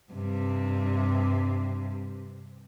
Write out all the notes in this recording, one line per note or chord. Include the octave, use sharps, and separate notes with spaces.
G2 C3